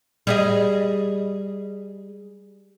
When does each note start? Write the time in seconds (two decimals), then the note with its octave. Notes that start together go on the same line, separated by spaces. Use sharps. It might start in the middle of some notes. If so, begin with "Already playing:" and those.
0.27 G3 G#4 D#5